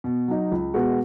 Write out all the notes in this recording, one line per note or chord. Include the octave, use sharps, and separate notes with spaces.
B2
F#3 D#4
C#2
B2 G#3 B3 F#4